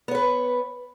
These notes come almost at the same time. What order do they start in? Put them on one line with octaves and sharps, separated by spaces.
B3 C#5 B4